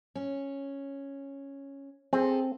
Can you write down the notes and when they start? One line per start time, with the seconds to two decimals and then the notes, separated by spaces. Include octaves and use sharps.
0.15 C#4
2.13 C4 G#4 A4